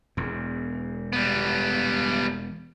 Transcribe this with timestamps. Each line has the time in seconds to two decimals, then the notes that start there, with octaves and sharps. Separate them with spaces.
0.17 E1 E2
1.13 G3 B3